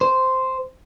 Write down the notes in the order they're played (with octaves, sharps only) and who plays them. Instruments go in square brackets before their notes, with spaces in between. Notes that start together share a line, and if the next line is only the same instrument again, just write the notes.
[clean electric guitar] C5